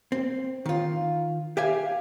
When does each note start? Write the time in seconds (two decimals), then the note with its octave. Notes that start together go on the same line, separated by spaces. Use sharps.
0.12 C4
0.66 D#3 F4
1.57 G4 E5 F5 G#5